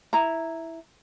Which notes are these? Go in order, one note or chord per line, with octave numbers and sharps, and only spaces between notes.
E4 A#5